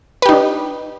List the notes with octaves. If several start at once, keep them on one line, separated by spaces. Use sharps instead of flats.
D4 D#4 G4 B4